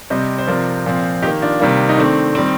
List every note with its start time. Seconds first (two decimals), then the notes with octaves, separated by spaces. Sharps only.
0.10 C3 G3 C4 C5 D#5
0.38 C5
0.47 C3 F3 C4 A#4 D5
0.86 A#2 F3 C4
1.22 D#3 A#3 D#4 G4
1.42 D4 F4
1.60 C3 D#3 G3 A#3
1.89 D#4
1.97 D#3 A3 C4 D4
2.35 D#3 G3 C4